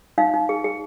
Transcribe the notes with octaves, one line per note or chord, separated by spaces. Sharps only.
D#4 F5
D#4
G#4
G#4